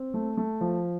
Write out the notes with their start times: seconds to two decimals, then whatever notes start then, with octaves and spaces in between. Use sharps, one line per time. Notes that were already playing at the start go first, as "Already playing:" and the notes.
Already playing: C4
0.14 A3
0.37 A3
0.61 F3